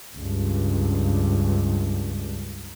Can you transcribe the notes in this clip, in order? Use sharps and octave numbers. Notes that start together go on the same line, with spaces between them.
C#2 G2